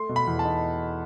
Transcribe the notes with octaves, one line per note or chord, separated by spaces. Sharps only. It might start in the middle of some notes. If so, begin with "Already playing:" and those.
Already playing: A3 C6
B2
B5
E2
A5
D#4